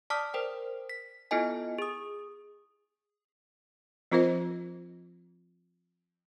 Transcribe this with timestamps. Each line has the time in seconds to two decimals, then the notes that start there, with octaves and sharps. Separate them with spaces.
0.10 D5 A5 D6 D#6 F6 B6
0.34 A#4 C5 G5
0.89 B6
1.31 B3 E4 F4 A4 D#5 G#5
1.79 G#4 D#6
4.12 F3 C4 F4 A#4 C5 D#5